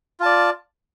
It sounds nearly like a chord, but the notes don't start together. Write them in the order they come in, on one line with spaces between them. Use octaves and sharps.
F4 A5 D5